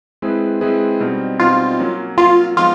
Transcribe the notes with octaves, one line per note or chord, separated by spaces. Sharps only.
G#3 C4 E4 G#4 B4
G#3 C4 E4 G#4 B4
B2 G3 C4 D#4
B2 G3 C4 D#4 F4
F#3 A#3 C#4
F#3 A#3 C#4 F4
F3 G#3 B3 D#4 F4